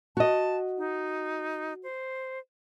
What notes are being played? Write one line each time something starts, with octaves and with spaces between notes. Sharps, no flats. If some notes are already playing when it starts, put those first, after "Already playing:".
F#4 D#5 A5
D#4
C5